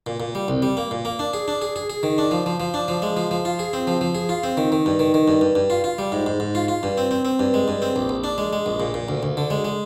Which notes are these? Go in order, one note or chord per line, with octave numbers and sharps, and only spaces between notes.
A#2
A#2
G3
C2
G3
A#3
A#2
A#3
D4
G#4
D4
G#4
G#4
G#4
D#3
D4
F3
F3
F3
D4
F3
G#3
F3
F3
F4
G#4
C4
F3
F3
G#4
F4
C4
D#3
D#3
G2
D#3
D#3
G2
G2
G2
F4
F4
G3
G#2
G#2
G#2
F4
F4
G2
C4
C4
C4
G2
G#3
G2
C4
A#1
A#1
D4
G#3
G#3
A#1
A#2
A#2
D2
D2
D3
G#3
G#3